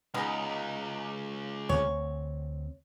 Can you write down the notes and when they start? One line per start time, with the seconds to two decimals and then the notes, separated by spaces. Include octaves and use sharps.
0.14 C#2 G#3 B3 D#4
1.69 D2 C4 C#5